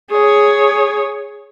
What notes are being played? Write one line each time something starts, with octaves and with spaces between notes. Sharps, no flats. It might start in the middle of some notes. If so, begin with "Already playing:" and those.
G#4 C#5